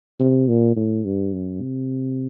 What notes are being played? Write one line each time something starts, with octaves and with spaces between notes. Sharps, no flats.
C3
A#2
A2
G2
F#2
C3